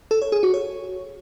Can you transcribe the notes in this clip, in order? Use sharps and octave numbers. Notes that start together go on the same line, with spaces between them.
A4
C#5
G#4
F#4
C#5